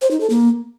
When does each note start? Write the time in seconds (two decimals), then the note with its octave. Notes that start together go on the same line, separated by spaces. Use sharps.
0.01 C5
0.11 D#4
0.20 A4
0.30 A#3